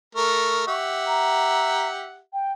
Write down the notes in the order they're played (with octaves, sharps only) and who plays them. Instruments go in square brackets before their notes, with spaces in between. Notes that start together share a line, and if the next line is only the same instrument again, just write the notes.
[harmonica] A3 A#4 [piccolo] C#6
[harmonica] G4 E5 F#5
[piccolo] A#5
G5